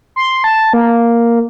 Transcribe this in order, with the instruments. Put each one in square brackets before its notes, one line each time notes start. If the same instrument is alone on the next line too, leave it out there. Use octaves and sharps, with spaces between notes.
[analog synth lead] C6
A5
A#3